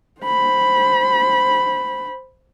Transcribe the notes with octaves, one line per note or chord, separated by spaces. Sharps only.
C5 B5